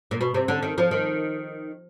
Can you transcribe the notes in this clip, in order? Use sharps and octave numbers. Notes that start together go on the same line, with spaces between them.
A#2
B2
C3
D3
D#3
F3
D#3